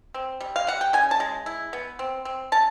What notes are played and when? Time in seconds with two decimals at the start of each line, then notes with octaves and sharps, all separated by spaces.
0.14 C4
0.41 G3
0.56 F5
0.67 G3 F#5
0.81 G5
0.93 C#3 G#5
1.11 A5
1.20 G#3
1.46 E4
1.73 B3
1.99 C4
2.25 C4
2.52 C#4 A5